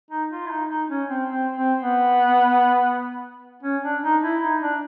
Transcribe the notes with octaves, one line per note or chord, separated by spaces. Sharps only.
D#4
F4
E4
D#4
D#4
C#4
C4
C4
C4
B3
C#4
D4
D#4
E4
D#4
D4